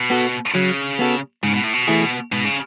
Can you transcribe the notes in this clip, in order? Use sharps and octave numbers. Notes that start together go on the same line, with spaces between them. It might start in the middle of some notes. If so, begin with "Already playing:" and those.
Already playing: B2
B3 F#4 A4
C#3 F#3
B3 F#4 A4
G#2 C#3
B2
A2
B2
E3 A3 E4 G#4
G#2 B2
C#3